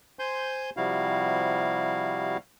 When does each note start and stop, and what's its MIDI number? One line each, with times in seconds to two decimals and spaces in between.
0.19 0.70 72
0.19 0.70 80
0.19 0.70 84
0.19 0.70 91
0.77 2.37 48
0.77 2.37 53
0.77 2.37 55
0.77 2.37 64
0.77 2.37 66
0.77 2.37 77